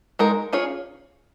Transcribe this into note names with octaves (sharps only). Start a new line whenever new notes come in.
G#3 D#4 A#4
C#4 F4 G#4 C#5